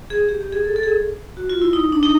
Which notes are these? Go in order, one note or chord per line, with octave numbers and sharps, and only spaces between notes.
G#4
G4
G4
G#4
A4
A4
G#4
F#4
F4
E4
D#4
D4
D#4